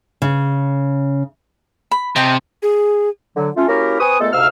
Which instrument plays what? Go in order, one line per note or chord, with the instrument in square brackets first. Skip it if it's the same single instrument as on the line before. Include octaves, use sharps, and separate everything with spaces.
[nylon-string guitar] C#3
[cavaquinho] B5
[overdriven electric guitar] C3 [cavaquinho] D#5 G5 A5
[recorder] G#4
[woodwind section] D3 F#3
A3 C#4 F4
A#3 C#4 E4 F#4 G4 A#4
C4 B4 G#5 C#6 D#6
A#2 G#3 A3 B3 A4
D2 G#2 C3 F5 E6 F6